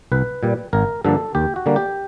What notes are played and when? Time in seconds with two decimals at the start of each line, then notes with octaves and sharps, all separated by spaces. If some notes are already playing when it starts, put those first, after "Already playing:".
0.12 C2 B4
0.43 A#2 G3
0.73 G#1 A#4
1.04 G2 D3 F3 A#3 A4
1.35 D#2 G4
1.56 F#4
1.66 D3 G3 A#3
1.76 G4